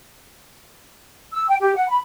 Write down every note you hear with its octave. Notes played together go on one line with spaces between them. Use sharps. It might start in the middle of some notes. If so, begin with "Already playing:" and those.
E6
G5
G4
F#5
B5